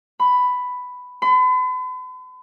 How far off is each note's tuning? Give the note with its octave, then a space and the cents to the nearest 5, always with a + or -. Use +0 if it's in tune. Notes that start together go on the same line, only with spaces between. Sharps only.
B5 +10
B5 +45